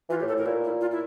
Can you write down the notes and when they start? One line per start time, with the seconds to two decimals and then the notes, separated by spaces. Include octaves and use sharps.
0.10 E3 F4
0.20 A2 G4
0.28 A4
0.34 A2 A#4
0.46 A#2 E4
0.64 E4
0.81 F4
0.91 E4